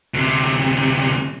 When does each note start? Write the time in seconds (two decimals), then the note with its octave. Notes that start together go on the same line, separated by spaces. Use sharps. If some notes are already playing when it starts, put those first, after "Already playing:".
0.14 D2 C3